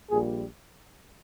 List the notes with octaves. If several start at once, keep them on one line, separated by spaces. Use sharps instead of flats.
A#1 A#2 G3 G#4